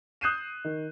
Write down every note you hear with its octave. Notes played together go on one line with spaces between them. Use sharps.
D#6 F#6 G6 C7 D#7 E7
D#3